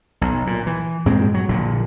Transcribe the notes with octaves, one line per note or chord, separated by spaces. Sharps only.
B1
A#2
E3
G2 A#2 G#3 C4
F#3
A#1 A#2 D3